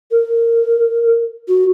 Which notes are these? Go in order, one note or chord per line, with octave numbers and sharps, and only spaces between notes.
A#4
F#4